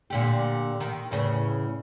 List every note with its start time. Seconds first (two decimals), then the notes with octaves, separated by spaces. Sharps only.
0.10 A#2 D3 G4
0.80 D#3
1.11 E2 A2 C#3